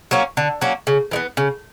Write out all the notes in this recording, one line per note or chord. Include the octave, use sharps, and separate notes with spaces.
F#3 A#3 C#4
D3
F#3 A#3 C#4
C#3
E3 G#3 B3
C#3